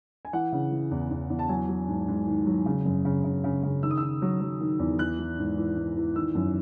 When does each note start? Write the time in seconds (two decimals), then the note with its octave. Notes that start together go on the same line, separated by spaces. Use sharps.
0.25 G#5
0.33 E3 F#5
0.52 C#3
0.72 E3
0.91 E2
1.11 E2
1.30 E2
1.39 A5
1.49 F#3 G#5
1.68 F#3
1.88 G#2
2.08 G#2
2.27 D#3
2.46 F#3
2.66 C#3
2.85 F#2
3.05 C#3
3.24 C#3
3.44 C#3
3.63 C#3
3.83 D#3 E6
3.91 D#6
3.98 D#3 E6
4.22 F#3
4.41 F#3
4.61 D#3
4.79 E2
4.99 E3 F#6
5.19 E3
5.38 G#2
5.58 E3
5.77 G#2
5.97 E3
6.15 D#3 E6
6.35 F#2